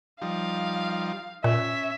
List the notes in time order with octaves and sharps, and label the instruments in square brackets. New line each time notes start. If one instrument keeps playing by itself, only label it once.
[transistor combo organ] F3 G3 D#4 [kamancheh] F5
[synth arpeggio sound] A#2 [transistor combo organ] C#4 [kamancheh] E5